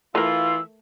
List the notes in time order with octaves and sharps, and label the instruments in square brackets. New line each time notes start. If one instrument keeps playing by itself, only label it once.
[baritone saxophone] E3 [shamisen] A3 A#4 [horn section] F4 [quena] E6